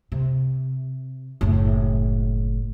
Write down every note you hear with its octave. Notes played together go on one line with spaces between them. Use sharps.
C3
F#1 A2